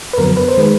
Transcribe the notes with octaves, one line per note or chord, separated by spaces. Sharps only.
B4
F2 D3 F#3 B3 A#4
B4
C5
D#3 G#3 B4